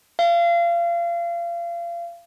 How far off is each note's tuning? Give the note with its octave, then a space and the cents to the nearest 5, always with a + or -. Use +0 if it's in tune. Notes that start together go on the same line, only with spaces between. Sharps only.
F5 -30